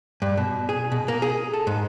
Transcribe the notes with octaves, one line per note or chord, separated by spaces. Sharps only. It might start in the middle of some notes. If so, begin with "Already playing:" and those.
G2
B2
G#4
B2
A#3
G#4
A4
G#2